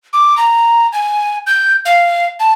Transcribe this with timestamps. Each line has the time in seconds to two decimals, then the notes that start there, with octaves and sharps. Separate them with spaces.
0.13 D6
0.37 A#5
0.93 G#5
1.47 G6
1.85 F5
2.40 A5